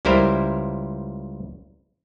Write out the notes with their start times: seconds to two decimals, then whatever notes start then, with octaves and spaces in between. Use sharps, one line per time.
0.05 C#2 G3 E4 A#4 C5